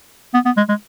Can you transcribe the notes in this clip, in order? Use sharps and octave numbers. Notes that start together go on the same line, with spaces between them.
B3
B3
G#3
G#3